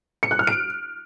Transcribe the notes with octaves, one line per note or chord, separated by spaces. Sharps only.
C#7
F#6
F6
D7